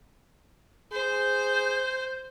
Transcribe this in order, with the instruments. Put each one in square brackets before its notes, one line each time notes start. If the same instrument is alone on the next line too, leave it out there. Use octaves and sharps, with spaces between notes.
[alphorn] G#4 [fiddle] C5 [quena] G6